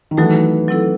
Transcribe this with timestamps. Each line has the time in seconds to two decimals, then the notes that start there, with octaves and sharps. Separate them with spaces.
0.11 D#3
0.17 E3 F#3 A3 D#4 F#4 A4
0.68 F#3 C4 E4 A4